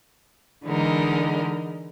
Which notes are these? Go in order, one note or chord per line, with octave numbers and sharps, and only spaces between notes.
D3 E3 G#3 D#4 A#4